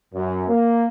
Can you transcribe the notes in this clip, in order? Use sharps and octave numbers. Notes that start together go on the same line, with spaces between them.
F#2
A#3